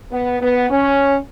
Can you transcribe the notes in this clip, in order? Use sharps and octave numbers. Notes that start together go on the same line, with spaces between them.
B3
B3
C#4